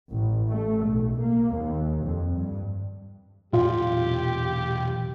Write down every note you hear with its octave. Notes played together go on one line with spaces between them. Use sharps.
A1
A3
B1
A#3
D#2
F2
G2
B1 E2 A#2 F4 G4